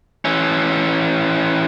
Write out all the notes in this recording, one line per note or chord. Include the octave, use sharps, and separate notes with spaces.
E3 C#4